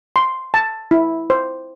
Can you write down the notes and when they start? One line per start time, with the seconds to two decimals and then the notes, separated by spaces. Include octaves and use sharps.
0.16 C6
0.54 A5
0.91 E4
1.30 C5